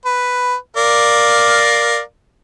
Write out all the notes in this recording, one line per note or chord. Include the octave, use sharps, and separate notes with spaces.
B4
A#4 D5 F5